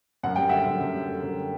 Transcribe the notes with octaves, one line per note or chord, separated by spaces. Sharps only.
F#2 F#5
G3 G5
D3 E5 F#5
F#2
F#2
G3
D3
F#2